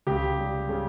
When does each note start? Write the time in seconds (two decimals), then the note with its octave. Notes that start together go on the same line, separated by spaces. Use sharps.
0.07 C#2 G4
0.38 G3
0.69 C#3